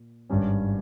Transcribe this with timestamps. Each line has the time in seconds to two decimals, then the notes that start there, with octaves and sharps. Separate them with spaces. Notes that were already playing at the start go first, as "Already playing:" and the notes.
Already playing: A#2
0.30 G#1 G2 G3 C#4